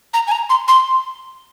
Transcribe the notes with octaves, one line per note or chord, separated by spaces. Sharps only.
A#5
G#5
A#5
C6
C6